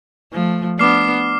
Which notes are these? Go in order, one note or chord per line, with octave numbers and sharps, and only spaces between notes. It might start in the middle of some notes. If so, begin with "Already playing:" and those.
F3 A3
B3 D4 D6 F6 C7